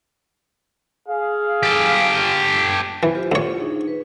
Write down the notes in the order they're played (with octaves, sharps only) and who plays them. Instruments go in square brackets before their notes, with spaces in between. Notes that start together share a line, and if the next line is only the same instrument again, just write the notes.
[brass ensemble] G#4 F5
[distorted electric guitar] G4 A4
[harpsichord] E3
[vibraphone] F4 G4 C5
[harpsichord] D2 C#5
[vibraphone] D4 D#4 G#4
B4